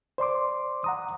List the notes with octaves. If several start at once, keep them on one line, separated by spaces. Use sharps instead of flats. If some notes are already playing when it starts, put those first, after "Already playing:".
C5 D5 C6 D6
F#5 A#5 D#6